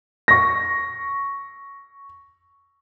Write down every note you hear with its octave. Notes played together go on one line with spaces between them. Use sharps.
C#6 A#6